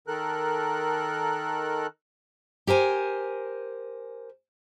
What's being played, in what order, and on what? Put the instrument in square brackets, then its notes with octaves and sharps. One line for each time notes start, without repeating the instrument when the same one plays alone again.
[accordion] D#3 A4 A#4 F#6
[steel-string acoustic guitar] G4 A#4 C5 G#5